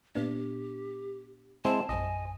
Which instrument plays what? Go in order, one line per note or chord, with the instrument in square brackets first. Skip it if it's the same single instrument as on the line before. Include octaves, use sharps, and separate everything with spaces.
[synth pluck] A#2 B3 D4 [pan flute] G4
[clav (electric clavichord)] G#3 C4 E4 [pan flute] A5
[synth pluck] A#1 F#2 [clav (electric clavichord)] D#5 [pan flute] G#5